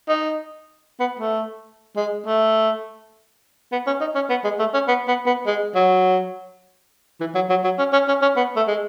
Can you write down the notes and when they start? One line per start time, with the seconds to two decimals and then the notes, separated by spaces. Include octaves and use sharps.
0.09 D#4
1.00 B3
1.19 A3
1.96 G#3
2.26 A3
3.72 B3
3.87 C#4
4.00 D#4
4.15 C#4
4.29 B3
4.44 G#3
4.59 A3
4.73 C#4
4.88 B3
5.08 B3
5.26 B3
5.46 G#3
5.75 F#3
7.20 E3
7.35 F#3
7.50 F#3
7.64 F#3
7.78 C#4
7.93 C#4
8.08 C#4
8.22 C#4
8.37 B3
8.56 A3
8.67 G#3